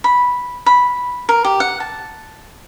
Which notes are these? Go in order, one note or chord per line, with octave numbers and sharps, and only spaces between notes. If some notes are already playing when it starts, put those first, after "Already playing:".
B5
B5
A#4
G4
F#5
A5